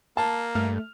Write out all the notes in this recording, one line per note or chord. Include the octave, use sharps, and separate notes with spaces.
A#3 A5
G2 A3 F6